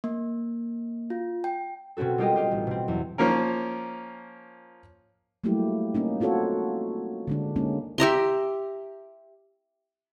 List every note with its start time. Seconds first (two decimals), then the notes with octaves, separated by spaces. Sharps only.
0.04 A#3
1.10 F4
1.44 G5
1.97 B2 C4 C#4 F#4 A4
2.18 G3 G#3 F4 G4 A#4 D#5
2.36 F4 G4 F5
2.51 A1
2.67 B2 C4
2.88 E2 F#3
3.18 F3 A#3 C#4 A#4
5.44 F#3 G3 A3 A#3 E4 G4
5.94 A#3 C#4 D#4
6.20 C4 F4 F#4 A4 C#5
7.28 D3 G#3 D4
7.56 G#3 A#3 C#4 D#4
7.98 G4 E5 A#5 C6